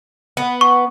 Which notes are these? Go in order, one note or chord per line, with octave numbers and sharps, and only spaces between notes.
B3
C#6